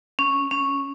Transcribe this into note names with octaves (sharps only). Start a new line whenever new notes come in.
C#4
C#4